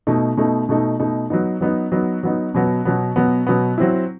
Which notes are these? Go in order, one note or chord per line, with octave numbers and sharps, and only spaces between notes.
B2 A3 D#4
B2 A3 D#4
B2 A3 D#4
B2 A3 D#4
F#3 B3 D#4
F#3 B3 D#4
F#3 B3 D#4
F#3 B3 D#4
B2 F#3 B3
B2 F#3 B3
B2 F#3 B3
B2 F#3 B3
F#3 C4 E4